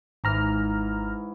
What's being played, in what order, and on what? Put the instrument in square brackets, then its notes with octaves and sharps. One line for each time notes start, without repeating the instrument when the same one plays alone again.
[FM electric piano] G#1 A#5 F6 [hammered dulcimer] G#2 E3